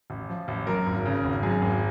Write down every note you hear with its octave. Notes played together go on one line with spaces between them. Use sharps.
A1
F3
A1
F#2 A#4
G#1
C#3
G#1
F#2 G#4
G#1